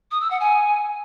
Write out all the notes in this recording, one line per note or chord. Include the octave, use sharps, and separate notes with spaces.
D#6
E6
F#5
G#5